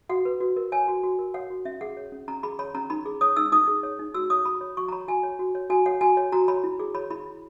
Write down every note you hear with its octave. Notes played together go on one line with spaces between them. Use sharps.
F#4 F#5
B4
F#4
A#4
C#5 G#5
F#4
F#4
A#4
C#5 F#5
F#4
C#4 E5
G#4 F#5
C#5
C#4
C#4 A#5
G#4 B5
C#5 B5
C#4 A#5
D#4 B5
G#4
C#5 D#6
D#4 E6
D#4 D#6
G#4
C#5
D#4
F#4 E6
C#5 D#6
F#4 B5
C#5
F#4 C#6
A#5
C#5 B5
F#4 G#5
C#5
F#4
C#5
F#4 G#5
C#5 F#5
F#4 G#5
C#5
F#4 A#5
C#5 B5
E4
G#4
C#5 B5
E4 B5
E4